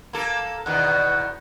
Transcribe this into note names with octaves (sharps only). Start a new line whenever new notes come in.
A#3 A4
E2 B2 D#3 F#5